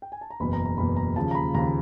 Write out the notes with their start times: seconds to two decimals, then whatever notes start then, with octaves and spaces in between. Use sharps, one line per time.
0.02 G5
0.12 G#5
0.21 A5
0.30 A#5
0.40 F#1 E2 B2 B5
0.53 A#5
0.66 A#5
0.78 F#1 E2 B2 B5
0.96 A#5
1.16 D#2 C#3 F3 A5
1.31 A#5
1.35 B5
1.54 D#2 C#3 F3 A#5